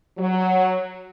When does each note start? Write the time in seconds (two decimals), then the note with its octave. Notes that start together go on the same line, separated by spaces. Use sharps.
0.18 F#3